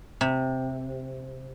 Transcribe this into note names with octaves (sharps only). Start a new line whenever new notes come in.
C3